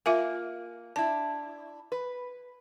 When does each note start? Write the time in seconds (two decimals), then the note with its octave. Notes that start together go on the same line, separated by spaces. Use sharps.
0.06 A#3 F4 E5 G#5
0.96 D4 E4 A5
1.92 B4